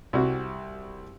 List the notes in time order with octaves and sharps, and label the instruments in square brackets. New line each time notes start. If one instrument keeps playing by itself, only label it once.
[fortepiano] C2 G3 F#4